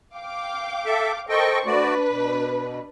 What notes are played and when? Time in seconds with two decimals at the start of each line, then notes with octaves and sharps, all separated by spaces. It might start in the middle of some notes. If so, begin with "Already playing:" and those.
0.15 F5 G5 D6
0.86 A4 E5
1.29 A4 A#4 C5 D#5 G5 C#6
1.66 A3 D4 F#4 B4 D5
2.10 B2